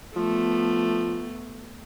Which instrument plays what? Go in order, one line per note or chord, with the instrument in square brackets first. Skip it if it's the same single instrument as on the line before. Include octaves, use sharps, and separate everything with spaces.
[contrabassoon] F3 [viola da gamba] A3 B3